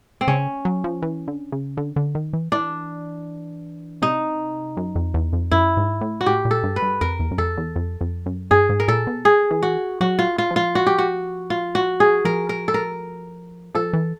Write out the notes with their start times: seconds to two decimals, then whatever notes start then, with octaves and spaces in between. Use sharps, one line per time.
0.21 C4
0.28 C#3 C#4
0.65 F#3
0.84 F3
1.02 E3
1.28 D3
1.52 C#3
1.77 D3
1.96 D3
2.15 D#3
2.33 E3
2.52 E3 D4
4.02 C3 D#4
4.77 F#2
4.96 F2
5.14 E2
5.33 F2
5.52 F#2 E4
5.77 G#2
6.01 A2
6.21 F#4
6.26 A2 G4
6.45 A#2
6.51 A4
6.64 G2
6.76 B4
6.82 G2
7.01 F2 A#4
7.20 E2
7.31 F#2
7.38 F2 A4
7.58 E2
7.76 F2
8.01 F2
8.26 F#2
8.51 G2 G#4
8.69 G#2
8.80 A#4
8.88 A#2 A4
9.07 B2
9.25 G#4
9.51 E3
9.62 F#4
10.01 F#3 F#4
10.19 F4
10.38 F4
10.51 F3
10.56 F4
10.75 F#4
10.87 G4
10.98 F#4
11.50 F4
11.75 F#4
12.00 G#4
12.25 F3 A#4
12.49 A#4
12.68 A4
12.74 A#4
13.75 F3 A4
13.93 E3